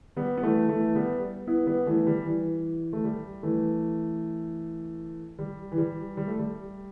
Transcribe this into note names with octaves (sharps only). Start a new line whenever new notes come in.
G3 B3
B3
E3 A3
E3 A3
G3 B3
B3 E4
G3 B3
E3 A3
G3
E3
A3
G3
E3 A3
G3
E3
G3
G3
A3
G3